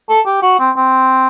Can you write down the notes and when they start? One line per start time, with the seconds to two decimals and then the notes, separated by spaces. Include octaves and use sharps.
0.09 A4
0.26 G4
0.42 F#4
0.59 C4
0.76 C4